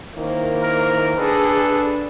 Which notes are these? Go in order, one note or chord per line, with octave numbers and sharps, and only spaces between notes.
D#3 A#3 C#4 E4 C5
A#4
D3 D4 G#4 A4 B4